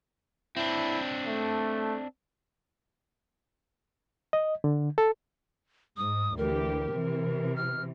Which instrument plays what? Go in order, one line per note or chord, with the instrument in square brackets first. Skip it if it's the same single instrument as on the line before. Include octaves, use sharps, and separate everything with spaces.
[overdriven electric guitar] C4 D4 [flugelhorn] E4
[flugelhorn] A3
[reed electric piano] D#5
D3
A4
[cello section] G#2 [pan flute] D#6
[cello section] D2 E3 G4 [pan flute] A#4
[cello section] C3 E3
[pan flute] F6